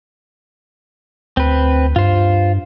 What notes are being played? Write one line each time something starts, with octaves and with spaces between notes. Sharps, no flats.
D2 C4 B4
G2 F4 C5